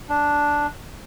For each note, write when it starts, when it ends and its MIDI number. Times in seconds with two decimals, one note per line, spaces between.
0.09 0.67 62